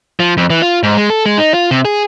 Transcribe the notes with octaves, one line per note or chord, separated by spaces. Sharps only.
F3
F2
E3
F4
G#2
G#3
A4
G#3
D#4
F4
C3
G#4